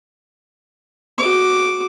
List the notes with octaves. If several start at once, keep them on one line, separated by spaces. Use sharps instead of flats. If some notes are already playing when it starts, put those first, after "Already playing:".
F#4 D6